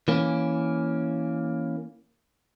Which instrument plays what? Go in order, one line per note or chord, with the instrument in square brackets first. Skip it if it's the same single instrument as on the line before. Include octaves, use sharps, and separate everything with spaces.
[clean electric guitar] E3 A#3 C#4